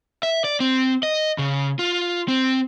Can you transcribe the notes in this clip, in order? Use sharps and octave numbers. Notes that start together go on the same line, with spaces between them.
E5
D5
C4
D#5
C#3
F4
C4